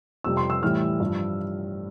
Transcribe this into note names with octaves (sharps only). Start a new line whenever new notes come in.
F2 C3 G3 E6
C6
E6
A2 E3 G3 F6
G2 F3